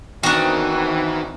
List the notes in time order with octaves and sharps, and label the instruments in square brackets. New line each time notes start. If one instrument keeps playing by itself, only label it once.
[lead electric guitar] D#3 [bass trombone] E3 [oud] B3 C4 D#4 [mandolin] D4 F#4